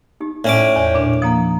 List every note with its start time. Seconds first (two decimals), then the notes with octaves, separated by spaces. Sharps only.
0.20 D#4 G4
0.44 A2 C#4 D5 D6
0.76 E2 C#5 D5
0.95 A#2 D4
1.22 F3 A#3 F#5 A#5 D#6